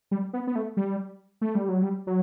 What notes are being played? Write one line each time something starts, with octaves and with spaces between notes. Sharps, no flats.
G3
B3
B3
A3
G3
A3
G3
F#3
G3
F#3